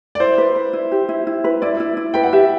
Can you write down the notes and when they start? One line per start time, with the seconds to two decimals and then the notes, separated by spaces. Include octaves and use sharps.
0.15 D5
0.20 E4 C5
0.38 B4
0.56 B4
0.73 E4
0.92 G4
1.09 E4
1.27 E4
1.44 B4
1.62 E4 D5
1.80 E4
1.97 E4
2.14 B4 G5
2.23 F#5
2.33 G4 E5